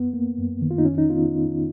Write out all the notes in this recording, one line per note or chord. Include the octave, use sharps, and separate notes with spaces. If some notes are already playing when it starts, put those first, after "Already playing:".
Already playing: F#2 B3
A#3
F#2
D#3
F4
D#4
F2 C#4
D#4
B3 F4